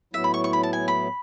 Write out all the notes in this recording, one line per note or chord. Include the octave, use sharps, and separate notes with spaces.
A2 F#3 B3 E4 E5
B5
C#6
C#6
B5
A5
G#5
B5